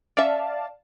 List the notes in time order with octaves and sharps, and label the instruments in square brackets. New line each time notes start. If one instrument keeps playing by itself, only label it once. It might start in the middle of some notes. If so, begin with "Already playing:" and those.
[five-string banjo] C#4 E5 [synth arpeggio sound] D5 F5 A5